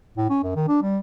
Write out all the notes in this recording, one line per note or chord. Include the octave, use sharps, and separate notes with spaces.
A2
C#4
F#2
D#3
D4
G3